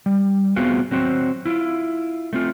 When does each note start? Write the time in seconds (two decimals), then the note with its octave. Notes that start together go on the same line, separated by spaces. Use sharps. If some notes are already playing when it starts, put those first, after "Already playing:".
0.06 G3
0.56 A3 B3 C4 F4 F#4 G#4
0.91 F#3 C4 F#4 C5
1.46 E4 F4
2.33 A3 C4 F4